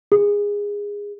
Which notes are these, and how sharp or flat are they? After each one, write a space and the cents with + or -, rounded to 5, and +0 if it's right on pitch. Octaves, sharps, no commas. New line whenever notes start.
G#4 -20